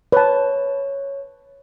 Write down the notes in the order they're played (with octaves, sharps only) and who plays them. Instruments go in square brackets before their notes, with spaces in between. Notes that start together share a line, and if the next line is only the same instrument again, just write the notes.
[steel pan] B4 A5 [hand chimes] C#5